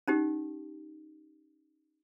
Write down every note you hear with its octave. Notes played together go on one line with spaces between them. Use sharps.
C#4 D#4 G4